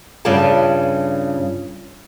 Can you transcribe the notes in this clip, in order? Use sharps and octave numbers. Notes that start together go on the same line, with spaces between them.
G2 C#3 F4 C#5 D5 A5